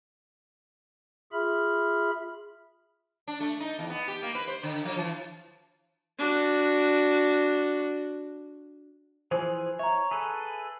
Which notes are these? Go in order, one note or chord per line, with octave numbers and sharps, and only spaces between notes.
F4 G#4 E5 B5 F6
D4
A3
D#4
E2
B3
G4
A#3
B4
C5
D3
F3
E3
D4 F#4
E3 F3 G#4 C5
C#5 E5 A#5
G#4 A4 B4